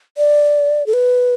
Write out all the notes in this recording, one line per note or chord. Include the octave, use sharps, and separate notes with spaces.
D5
A4
B4